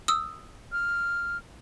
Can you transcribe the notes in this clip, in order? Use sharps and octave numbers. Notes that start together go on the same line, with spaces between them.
D#6 E6
F6